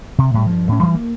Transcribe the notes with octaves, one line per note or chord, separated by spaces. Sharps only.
C3
A2 G3
G2 F3
A2 C#4
G2 E3 G3
A#3